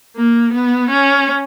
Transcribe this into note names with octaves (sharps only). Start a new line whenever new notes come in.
A#3
B3
C#4